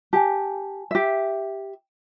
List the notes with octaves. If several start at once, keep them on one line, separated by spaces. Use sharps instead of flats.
G4 G#5 A5
G4 E5